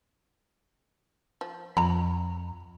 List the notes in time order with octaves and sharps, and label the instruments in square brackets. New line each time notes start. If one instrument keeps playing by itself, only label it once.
[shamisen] F3
[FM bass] F2 [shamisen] A#5 B5